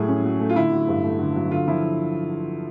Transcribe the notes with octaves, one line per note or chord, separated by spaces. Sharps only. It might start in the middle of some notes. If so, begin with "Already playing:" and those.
Already playing: A2 F#3 G3 A3 G#4
C#4
F#3
A3
F4
D3 E4
F#3
G2
A3
D3
F#3
D3 F4
F3 E4